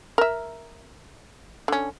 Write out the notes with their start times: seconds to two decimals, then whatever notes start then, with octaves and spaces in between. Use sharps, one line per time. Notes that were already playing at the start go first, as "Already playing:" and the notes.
0.18 A#4 E5
1.68 D3 C#4